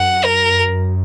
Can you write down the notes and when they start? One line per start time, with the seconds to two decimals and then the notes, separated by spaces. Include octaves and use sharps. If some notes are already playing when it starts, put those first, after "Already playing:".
Already playing: F#2 F#5
0.24 A#4